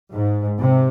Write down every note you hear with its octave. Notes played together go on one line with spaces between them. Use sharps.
G#2
C3